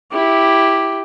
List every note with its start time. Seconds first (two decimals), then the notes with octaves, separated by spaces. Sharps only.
0.12 E4 G4